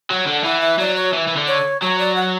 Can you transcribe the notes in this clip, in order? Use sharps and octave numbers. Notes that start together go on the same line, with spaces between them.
F#3 F#5
D3
E3 F#5
E5
F#3 D5
C#5
E3
E3
D3
C#5
F#3 C#5
D5
F#5